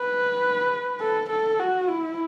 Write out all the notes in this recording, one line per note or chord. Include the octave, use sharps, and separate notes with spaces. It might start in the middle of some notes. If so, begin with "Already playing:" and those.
Already playing: B4
A4
A4
F#4
E4